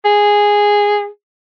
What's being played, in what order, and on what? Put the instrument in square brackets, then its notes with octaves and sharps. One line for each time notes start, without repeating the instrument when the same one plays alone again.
[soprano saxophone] G#4